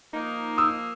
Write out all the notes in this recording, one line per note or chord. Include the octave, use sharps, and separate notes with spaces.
F3 A#3 D#4
D#6 E6